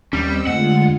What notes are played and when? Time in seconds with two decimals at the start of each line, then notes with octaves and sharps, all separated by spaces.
0.13 D#2 G3 C4 C#4 D#5 E6
0.47 F2 D3 G#3 A3 F4 F#5